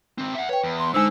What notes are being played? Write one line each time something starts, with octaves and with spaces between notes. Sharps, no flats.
D#3 C4
E5 F#5
B4 C#5 G5
E2
C6
D3 G#3 D#4 C5 E6